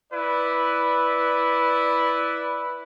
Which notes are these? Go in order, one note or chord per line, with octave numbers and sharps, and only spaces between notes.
E4 B4 D5